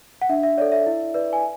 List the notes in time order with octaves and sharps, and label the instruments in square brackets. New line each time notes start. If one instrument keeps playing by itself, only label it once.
[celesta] F#5
D4 E5
E5
A4 C#5 D5
E5
E4
B4 D5
G#5